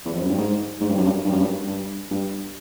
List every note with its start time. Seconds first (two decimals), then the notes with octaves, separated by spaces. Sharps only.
0.05 E2
0.13 F2
0.22 F#2
0.29 G2
0.37 G#2
0.81 G#2
0.89 G2
0.97 F#2
1.05 G2
1.25 G2
1.32 F#2
1.40 G2
1.67 G2
2.11 G2